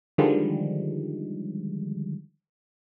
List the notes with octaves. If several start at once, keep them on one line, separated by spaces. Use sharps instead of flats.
D3 D#3 F3 G3 G#3